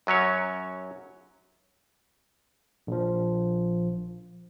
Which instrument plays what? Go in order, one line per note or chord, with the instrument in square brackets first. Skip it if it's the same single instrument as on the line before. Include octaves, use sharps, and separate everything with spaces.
[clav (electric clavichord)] F#2 F#3 C#4 C#5
[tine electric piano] A#1 F3